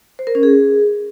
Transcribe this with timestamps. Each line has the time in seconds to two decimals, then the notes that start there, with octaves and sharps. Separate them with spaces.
0.19 C5
0.27 A#4
0.35 C#4
0.43 G#4